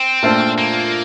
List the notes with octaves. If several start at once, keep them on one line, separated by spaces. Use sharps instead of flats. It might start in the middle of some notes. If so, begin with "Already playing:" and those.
Already playing: C4
A#2 A3 D4 F4 C5
A#3